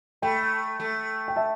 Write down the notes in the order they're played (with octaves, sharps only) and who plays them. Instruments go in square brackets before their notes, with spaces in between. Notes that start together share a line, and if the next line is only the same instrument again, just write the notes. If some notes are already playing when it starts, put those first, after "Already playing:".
[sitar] A3 [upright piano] G5 B5
[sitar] A3
[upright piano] G5
E5 A5